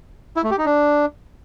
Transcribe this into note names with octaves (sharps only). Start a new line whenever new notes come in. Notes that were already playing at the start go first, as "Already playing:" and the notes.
E4
A3
G4
D#4
D4